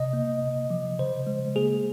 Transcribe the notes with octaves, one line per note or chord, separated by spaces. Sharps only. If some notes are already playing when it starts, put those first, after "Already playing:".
Already playing: C3 D#5
A#3
C3
F3
C#3 C5
G#3
A#3 G#4